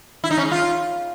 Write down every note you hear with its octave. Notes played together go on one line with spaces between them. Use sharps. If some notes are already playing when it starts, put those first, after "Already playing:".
E4
D#4
C#4
G#3
F4